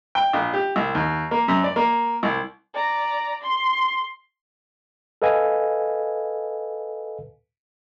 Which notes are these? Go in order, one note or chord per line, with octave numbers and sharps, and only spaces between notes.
G5
A#1
G4
C2
D#2
A#3
F#2
D5
A#3
C2
D5 A#5
C6
A4 B4 D#5 F5 G#5